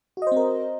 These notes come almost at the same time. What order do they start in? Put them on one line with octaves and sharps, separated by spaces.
F#4 D#5 C5 C4 A#4